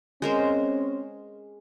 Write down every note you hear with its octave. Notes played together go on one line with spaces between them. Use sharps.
G#3 C4 C#4 A#4 C5